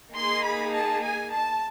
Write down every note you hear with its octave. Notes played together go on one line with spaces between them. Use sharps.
A#3 D#4 G#4 C6
B5
A5
G#5
A5